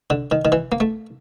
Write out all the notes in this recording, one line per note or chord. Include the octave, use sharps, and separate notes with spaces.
D3
D#3
D#3
E3
A#3
A3